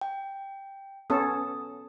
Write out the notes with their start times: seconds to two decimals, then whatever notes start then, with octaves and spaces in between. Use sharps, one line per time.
0.01 G5
1.10 B3 C#4 A4 D#6